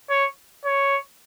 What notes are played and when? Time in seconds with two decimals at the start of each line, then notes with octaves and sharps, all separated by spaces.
0.10 C#5
0.65 C#5